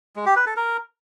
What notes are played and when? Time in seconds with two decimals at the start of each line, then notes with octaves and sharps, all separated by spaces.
0.16 G#3
0.26 G4
0.36 B4
0.46 A4
0.56 A#4